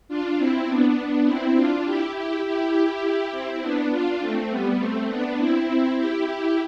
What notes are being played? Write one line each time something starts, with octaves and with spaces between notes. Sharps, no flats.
D4 F4
C4 E4
B3 D4
C4 E4
D4 F4
E4 G4
E4 G4
E4 G4
C4 E4
B3 D4
D4 F4
A3 C4
G3 B3
A3 C4
B3 D4
C4 E4
E4 G4